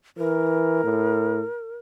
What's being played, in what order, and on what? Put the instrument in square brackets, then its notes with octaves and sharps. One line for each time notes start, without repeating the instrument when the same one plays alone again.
[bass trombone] E3 [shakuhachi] A#4
[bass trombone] A2